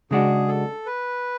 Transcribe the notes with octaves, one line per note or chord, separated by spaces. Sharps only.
C#3 G#3 D4 F#4 G#4
A4
B4